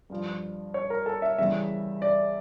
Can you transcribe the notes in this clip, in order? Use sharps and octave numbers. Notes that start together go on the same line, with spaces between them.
G2 F3
C#5
A#4
A4
E5
E2 C#3 G3 E5
D5